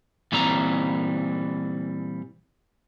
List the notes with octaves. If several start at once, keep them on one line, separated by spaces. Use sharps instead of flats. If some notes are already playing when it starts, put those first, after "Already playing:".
A#2 E3 G3 C4 A#5